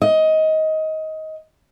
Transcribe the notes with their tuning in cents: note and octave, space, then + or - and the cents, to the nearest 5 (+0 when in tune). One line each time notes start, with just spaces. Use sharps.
D#5 +20